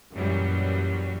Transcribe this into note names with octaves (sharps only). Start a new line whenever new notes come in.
F#2 A#2 E3 F#3 G3